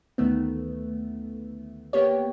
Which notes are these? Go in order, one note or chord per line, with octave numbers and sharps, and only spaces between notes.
D2 D#3 A3 B3
A#3 B3 G4 C#5